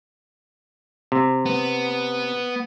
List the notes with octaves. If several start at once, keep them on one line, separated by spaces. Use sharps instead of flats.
C3
B3